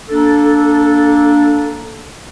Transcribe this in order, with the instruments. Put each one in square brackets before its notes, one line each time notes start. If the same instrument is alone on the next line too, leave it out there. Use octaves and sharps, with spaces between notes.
[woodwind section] A#3 D4 A4